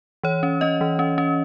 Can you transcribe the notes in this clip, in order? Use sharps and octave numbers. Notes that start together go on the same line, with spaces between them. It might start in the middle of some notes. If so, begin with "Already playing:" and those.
E3 C#5
C#4
C#4 D#5
E3
C#4
C#4